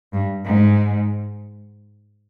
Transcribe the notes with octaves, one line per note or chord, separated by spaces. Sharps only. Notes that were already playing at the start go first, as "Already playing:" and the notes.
G2
G#2